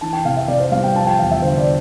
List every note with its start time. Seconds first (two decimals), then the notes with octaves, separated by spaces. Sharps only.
0.01 E3 A5
0.13 G5
0.25 C3 F5
0.37 E5
0.48 C3 D5
0.60 C5
0.72 G3 F5
0.84 G5
0.95 F3 A5
1.06 G5
1.18 E2 F5
1.31 E5
1.42 D3 C5
1.58 D5